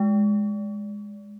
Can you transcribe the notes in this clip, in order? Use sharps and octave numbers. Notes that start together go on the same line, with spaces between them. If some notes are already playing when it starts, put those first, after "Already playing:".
Already playing: G#3